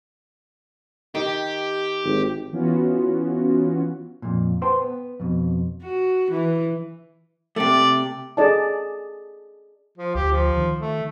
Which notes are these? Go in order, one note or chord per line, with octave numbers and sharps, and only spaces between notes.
D#3 G4
G#1
E3 B3 C#4 F4 F#4
F2 A#2
B4 C5 F#5 G5 A5 C6
B3
F2 B2
F#4
E3
C3 A3 D5
G#4 A4 D5 D#5 G#5 A5
F3
D2 G4
F3
D#3
A3